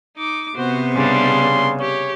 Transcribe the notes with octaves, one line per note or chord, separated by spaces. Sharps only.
D#4 D6
C3 B3 F#4 C5
C#3 G3 D4 C6
G4 C#5